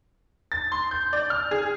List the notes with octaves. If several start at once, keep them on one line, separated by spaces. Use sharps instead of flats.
A6
C6
G6
D5
F6
G#4